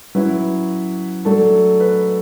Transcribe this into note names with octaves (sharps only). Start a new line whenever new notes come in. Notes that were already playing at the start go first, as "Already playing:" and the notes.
F#3 C#4 E4 B4
F#3 A3 D4 A4
B4